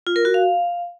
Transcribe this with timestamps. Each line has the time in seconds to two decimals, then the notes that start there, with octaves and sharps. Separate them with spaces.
0.07 F4
0.16 A#4
0.25 F#4
0.34 F5